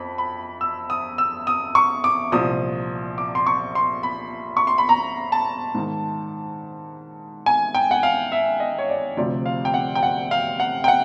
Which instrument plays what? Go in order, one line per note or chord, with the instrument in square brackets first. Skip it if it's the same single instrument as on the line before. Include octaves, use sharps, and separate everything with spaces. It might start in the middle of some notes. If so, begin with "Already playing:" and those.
Already playing: [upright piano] F2 B5
B5
E6
D#6
E6
D#6
C#6
D6
C2 A#2 F3 D#6
D6
C6
C#6
C6
B5
C#6
C6
B5
A#5
A5
G#2 D#3
G#5
G5
F#5
F5
E5
D#5
C#5
D5
D2 C3 F3 D5
F5
G5
F#5
G5
F#5
F5
F#5
G5
F#5